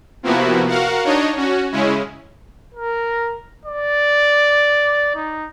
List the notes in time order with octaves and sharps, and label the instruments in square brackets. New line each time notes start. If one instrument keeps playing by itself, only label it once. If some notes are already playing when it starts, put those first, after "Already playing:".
[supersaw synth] C3 F3 A#3 B3 E4 F#4
F#4 A#4 F5 F#5
D4 D#4 C#5 D#5
C#4 F#4
C#3 G#3 C#4 E4
[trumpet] A#4
D5
D#4